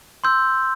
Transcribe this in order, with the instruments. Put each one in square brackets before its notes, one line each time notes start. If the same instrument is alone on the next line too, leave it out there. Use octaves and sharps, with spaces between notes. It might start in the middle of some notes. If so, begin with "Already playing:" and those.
[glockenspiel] C6 E6 G6